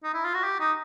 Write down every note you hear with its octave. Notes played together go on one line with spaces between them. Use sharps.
D#4
E4
F4
F#4
G4
D#4